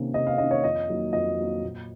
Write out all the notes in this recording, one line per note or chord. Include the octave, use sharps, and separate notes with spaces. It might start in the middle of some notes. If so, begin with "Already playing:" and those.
Already playing: C3 D#3 A#3 C#4
C3 D#5
F5
D#3 A#3 C#4 D#5
C#5
F2 D#5
D#3 F#3 A#3
F2 D#5
D#3 F#3 A#3
A#2